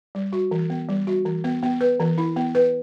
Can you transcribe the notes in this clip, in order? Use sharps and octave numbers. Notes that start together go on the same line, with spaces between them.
G3
F#4
E3
B3
G3
F#4
E3
B3
B3
B4
E3
E4
B3
B4